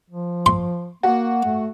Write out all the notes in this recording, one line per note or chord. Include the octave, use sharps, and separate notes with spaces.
F3
C6
A#3 F#4
A3